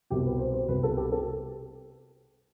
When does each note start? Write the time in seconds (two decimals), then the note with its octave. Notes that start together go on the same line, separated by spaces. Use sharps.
0.10 C2 B2 G4
0.25 B4
0.39 C5
0.54 C5
0.68 C2 B2 B4
0.83 A4
0.97 G4
1.12 A4